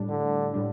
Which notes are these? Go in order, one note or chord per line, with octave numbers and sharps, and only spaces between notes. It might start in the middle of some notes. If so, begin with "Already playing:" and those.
Already playing: A2 G3 D4
D3
A2 G3 D4